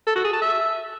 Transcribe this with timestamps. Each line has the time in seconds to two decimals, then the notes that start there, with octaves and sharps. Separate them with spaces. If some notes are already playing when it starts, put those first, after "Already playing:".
0.07 A4
0.16 F#4
0.24 G#4
0.33 A5
0.42 E5